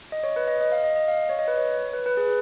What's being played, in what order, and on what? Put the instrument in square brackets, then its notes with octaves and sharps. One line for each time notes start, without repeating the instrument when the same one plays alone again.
[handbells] D#5
C#5
B4
D#5
D#5
F5
D#5
D#5
F5
C#5
D#5
B4
C#5
B4
B4
G#4